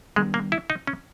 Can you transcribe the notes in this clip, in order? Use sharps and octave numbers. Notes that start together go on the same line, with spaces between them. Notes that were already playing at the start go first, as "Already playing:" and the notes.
D#3 G3 G#3 B3 D4
A#3
E4
D#4
C#4